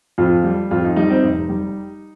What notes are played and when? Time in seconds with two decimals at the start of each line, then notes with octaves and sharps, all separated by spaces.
0.18 F2 F4
0.44 G3
0.71 F2 F4
0.84 D#4
0.96 G3 D#4
1.10 C4
1.23 F1 D#4
1.49 G3